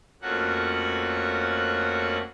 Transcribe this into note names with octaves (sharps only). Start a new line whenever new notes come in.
F2 A3 A#3 C#4 F#4 F#5